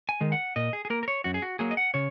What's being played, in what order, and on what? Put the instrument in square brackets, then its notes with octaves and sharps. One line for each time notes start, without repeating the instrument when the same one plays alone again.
[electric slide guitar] G#5
D#3 G#3
F#5
A#2 D#5
G#4
G#4
A#3 A#4
A#4
C#5
F#2 F#4
G#4
F#4
F#3 A#3 G#4
D#5
F#5
C#3 C#5